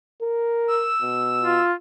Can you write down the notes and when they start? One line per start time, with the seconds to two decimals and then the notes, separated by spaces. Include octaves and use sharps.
0.22 A#4
0.68 E6
1.02 B2
1.41 F4